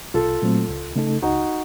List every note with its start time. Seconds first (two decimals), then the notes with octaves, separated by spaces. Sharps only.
0.14 C2 F4 A4
0.42 A#2 F#3 A3 C4
0.69 C#2
0.96 C#3 A3 D#4 A4
1.22 C#2 D#4 F#4